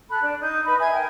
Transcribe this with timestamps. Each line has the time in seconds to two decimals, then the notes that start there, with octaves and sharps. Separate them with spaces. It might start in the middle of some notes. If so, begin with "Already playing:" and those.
0.09 A4 B5 F#6
0.22 D4
0.41 D#4 G6
0.66 D#4 B4 B5
0.79 G#4 E5 G#5 G#6
0.91 A#4 G5 G#5